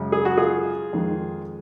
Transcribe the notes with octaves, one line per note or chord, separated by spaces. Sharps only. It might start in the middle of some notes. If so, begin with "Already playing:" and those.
Already playing: F#2 C#3 G#3
G#4
F#4
F4 G#4
F2 D#3 G#3